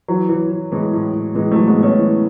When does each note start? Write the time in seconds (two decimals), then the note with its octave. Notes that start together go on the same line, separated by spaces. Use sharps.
0.08 E3 F#3
0.29 E3
0.50 E3
0.72 A2 E3 G#3
0.93 A2
1.14 A2
1.35 A2 E3 G#3
1.51 F#3 A3
1.57 E3
1.67 G#3 B3
1.78 A2 A3 C#4
1.99 E3